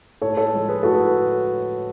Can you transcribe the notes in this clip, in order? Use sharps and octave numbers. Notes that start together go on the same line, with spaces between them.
A2 A4 C#5
A4 C#5
F3 G#3
G#4 B4
A2 F#4 A4
B4